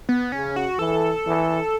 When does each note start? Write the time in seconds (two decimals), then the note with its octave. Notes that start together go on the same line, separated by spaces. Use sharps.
0.09 B3
0.32 C#3 C#4
0.56 F#4
0.79 E3 A4
1.27 E3